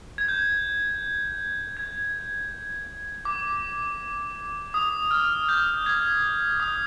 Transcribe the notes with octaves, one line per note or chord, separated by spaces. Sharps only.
G#6
G6
G#6
D6
D#6
F6
G6
G#6
D#6